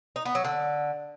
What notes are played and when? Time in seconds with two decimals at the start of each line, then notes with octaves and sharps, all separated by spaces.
0.16 D#4
0.25 B3
0.35 F#3
0.44 D3